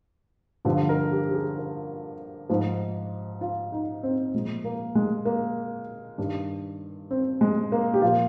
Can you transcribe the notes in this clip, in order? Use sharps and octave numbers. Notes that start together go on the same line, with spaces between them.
G2 D3 F3
A#4
G4
G4
G#4
A#4
G#2 F3
F4
D#4
C4
A#2 F3 G#3
A#3
G#3
A#3
G2 D#3
C4
G#3
A#3
G4
A#2 F3 F4